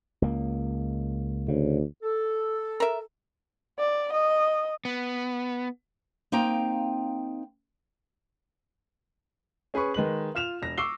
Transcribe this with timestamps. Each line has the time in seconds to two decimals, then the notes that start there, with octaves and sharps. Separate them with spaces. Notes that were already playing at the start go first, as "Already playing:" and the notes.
0.22 C#2 A#3
1.48 D2 C#3
2.03 A4
2.80 A#4 E5
3.79 D5
4.13 D#5
4.85 B3
6.32 A#3 C4 D#4 F5 G5 A#5
9.74 C#4 G#4 B4 B5 C#6
9.94 D#3 G#3 B4 F#7
10.35 F4 F6 E7 F7
10.62 E1 A#6
10.78 C#6 D6 E6 C7 G7